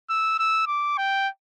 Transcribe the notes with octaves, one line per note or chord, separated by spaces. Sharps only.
E6
E6
D6
G5